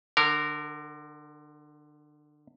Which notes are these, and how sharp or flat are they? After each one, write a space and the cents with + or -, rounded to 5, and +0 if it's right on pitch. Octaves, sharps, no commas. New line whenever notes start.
D3 +25 A#4 -15